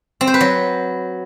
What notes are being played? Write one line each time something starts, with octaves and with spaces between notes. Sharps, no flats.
C4
C5
B4
F#3